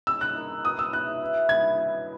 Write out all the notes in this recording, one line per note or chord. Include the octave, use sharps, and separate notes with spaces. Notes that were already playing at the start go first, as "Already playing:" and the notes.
G#3 C#4 G#4 E6
F#6
D#4 A#4 C#5
B3 F#4 C#5 D#6
E6
C#4 G#4 C#5 E5 F#6
E4 B4 E5
E4 G#4 C#5 G#6
E4 B4 D#5